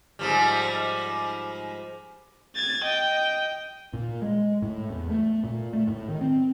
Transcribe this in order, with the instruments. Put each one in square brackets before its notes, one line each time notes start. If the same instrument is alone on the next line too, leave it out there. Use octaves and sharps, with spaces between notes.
[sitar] G#2 F3 G3
[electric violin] G#6 A6
D#5 G5
[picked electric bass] A#2
G#3
A2
E2
A3
A#2
A3
A2
D#3
C4